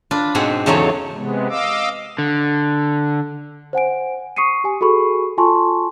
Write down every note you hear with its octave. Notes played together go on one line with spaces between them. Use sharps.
D4 F4 B4
G#2 B2 C4 G#4 F#5 B5
E2 C#3 F#3 A3 D#4 C#5
C3 G#3 B3
D#5 F5 D6 E6
D3
C5 F#5 G#5 D7
C#6 D#6 C7 C#7 D#7
G4 G#5
F#4 G#4 A4 B5 C#6
F4 A4 G#5 A5 C6 C#6